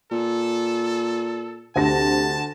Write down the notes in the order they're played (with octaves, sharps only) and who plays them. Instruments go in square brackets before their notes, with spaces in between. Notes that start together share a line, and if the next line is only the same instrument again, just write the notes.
[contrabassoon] A#2 [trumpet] A4
[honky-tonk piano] D2 A#6 [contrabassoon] C3 [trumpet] A5